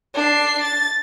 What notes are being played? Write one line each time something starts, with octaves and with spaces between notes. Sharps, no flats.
D4 C7
A6